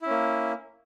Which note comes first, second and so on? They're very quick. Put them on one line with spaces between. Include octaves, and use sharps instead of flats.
E4 C#4 A#3